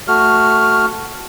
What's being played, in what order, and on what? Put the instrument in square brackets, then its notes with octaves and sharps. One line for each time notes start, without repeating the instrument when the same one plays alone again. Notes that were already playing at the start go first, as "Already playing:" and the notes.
[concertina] A3 F#4 F6